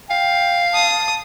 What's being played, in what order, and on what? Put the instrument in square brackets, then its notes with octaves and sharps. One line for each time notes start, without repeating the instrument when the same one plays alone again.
[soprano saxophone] F5 [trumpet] G5
[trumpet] A5 [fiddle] D#6